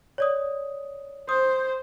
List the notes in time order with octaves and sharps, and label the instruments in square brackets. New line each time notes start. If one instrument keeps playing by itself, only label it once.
[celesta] C#5 D5 D#6
[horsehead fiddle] C5 [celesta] D#6